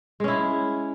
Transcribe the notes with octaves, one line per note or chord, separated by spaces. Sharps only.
G#3 C#4 E4